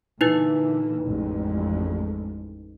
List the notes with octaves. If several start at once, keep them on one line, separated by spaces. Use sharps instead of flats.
A#2 D3 E3 D#4 E4 B4
A1 F2 G#3